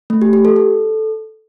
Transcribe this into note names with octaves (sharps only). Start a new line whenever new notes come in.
A3
G4
G4
A4
A4